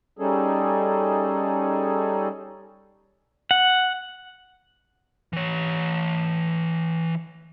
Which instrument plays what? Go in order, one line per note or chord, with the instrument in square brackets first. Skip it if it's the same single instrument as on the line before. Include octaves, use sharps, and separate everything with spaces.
[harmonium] G3 C#4 D#4 G#4 A4
[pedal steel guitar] F#5
[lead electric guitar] E3 C#5